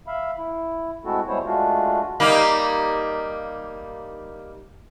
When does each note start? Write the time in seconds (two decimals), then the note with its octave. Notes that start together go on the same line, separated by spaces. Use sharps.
0.07 E5 F5 B5
0.38 E4
1.05 G#3 A3 C4 E4 F#4 A4
1.28 G3 G#3 B3 E4 C5 C#5
1.45 G#3 A3 D4 F4 F#4
2.20 G3 A#3 D#4